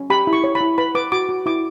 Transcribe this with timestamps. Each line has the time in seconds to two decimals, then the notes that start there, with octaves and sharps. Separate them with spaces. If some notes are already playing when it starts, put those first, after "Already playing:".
Already playing: C#4
0.10 G4 B5
0.27 E4
0.33 C#6
0.44 C#5
0.55 B5
0.61 E4
0.78 B4 B5
0.95 B4 D6
1.12 F#4 D6
1.29 F#4
1.46 E4 D6